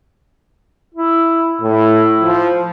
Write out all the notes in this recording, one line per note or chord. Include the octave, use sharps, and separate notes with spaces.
E4
A2 E4
F3